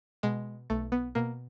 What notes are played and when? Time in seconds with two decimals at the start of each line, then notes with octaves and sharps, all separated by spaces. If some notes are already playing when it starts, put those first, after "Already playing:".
0.23 B2 G#3
0.70 B1 A3
0.92 B3
1.15 B2 A#3